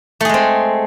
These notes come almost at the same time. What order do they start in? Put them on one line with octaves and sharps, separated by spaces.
A3 G#4 G#3 C4